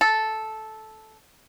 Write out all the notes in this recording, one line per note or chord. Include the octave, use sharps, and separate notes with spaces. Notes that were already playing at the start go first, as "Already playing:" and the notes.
A4